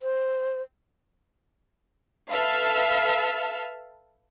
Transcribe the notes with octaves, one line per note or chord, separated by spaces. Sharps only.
C5
A4 B4 E5 F5 A5 F6